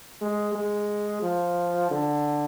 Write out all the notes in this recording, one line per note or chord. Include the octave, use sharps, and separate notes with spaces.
G#3
G#3
F3
D3